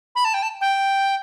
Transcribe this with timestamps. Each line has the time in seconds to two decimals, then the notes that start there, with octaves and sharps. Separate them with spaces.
0.15 B5
0.25 A5
0.34 G5
0.43 A5
0.61 G5